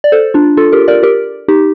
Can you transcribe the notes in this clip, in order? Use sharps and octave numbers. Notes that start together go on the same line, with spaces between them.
D5
A4 C5
D4 F4
F4 A4
G4 A#4
A#4 D5
G4 A#4
D#4 G4